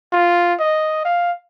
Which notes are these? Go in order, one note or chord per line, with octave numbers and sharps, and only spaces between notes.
F4
D#5
F5